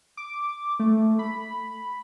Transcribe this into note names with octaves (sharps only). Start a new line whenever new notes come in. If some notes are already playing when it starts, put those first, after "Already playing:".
D6
A3
B5